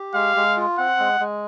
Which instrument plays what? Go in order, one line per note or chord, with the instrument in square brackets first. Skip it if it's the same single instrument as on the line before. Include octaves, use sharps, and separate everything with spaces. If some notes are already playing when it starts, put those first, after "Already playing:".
Already playing: [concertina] G4
[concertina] G#3 [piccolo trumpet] F5
[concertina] G#3
F4
[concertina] C4 [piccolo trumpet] F#5
[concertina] G#3
G#3